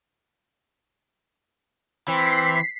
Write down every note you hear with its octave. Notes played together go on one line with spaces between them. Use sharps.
E3 C4 B6 C7